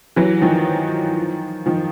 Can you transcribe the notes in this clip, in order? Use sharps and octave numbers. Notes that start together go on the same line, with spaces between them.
E3 F#3
D#3 F3
D#3 F3